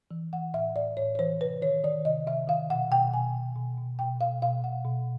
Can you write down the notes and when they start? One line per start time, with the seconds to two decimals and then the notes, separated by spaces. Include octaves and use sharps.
0.11 E3
0.33 E3 F#5
0.54 A2 E5
0.76 A2 D5
0.97 A2 C#5
1.15 C#5
1.19 E3 C5
1.41 C3 B4
1.62 D#3 C#5
1.84 D#3 D5
2.05 C3 D#5
2.27 C3 E5
2.48 D#3 F5
2.70 B2 F#5
2.91 B2 G5
3.13 B2 G#5
3.35 B2
3.56 B2
3.78 B2
3.99 B2 G5
4.21 B2 F5
4.42 B2 F5
4.64 B2 F#5
4.85 B2